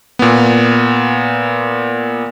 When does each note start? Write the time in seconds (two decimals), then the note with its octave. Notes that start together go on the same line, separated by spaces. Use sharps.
0.19 A#2 B3